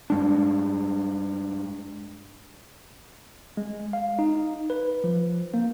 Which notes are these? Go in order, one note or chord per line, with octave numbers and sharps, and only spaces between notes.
G2 G#3 D4
G#3
F5
D#4
B4
F3
A#3